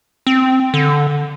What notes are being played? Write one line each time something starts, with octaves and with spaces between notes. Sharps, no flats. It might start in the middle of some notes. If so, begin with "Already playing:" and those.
C4
D3